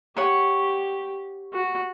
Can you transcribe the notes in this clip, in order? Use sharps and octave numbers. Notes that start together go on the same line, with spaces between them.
G4 C#5 F#5 C#6
F#4